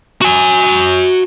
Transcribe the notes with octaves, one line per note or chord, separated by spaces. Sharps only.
F#4 G#5